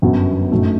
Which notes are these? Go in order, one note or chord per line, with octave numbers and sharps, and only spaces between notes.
G1 F#2 F#3 B3
G1 F#2 F#3 A3 D#4